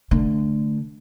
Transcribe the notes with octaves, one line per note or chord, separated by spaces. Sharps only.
D3 A3